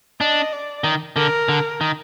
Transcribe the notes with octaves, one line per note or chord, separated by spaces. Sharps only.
D4 D#5
D5
D#3
D3 A#4
D3
D#3